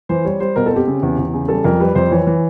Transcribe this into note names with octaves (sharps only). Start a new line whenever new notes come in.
E3 C5
G3 C#5
G3 C5
B2 A#4
A4
C4
G4
C#3
E2
E2
C#3
G3 A4
F2 A#4
G3 B4
F2 C5
E3 C#5
E3